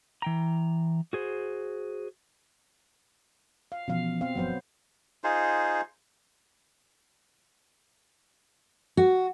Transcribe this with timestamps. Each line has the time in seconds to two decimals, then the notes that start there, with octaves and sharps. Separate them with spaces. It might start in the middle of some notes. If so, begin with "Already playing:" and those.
0.22 E3 G5 A#5
1.13 F#4 G#4 C5
3.72 F5
3.88 B2 E3 F3 C#4 F5
4.21 C4 F5
4.35 G1 F3 F#3 B3 C5
5.24 D#4 F4 G#4 C5
8.97 F#4